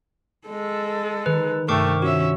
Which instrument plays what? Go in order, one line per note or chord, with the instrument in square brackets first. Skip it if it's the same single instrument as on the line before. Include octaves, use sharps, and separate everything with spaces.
[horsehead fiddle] G#3 A4
[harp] D#3 [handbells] B4
[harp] G2 C3 [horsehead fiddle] A3 G4 [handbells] A#4 C#6 D6
[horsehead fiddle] C#4 E5 [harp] F4 [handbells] F#4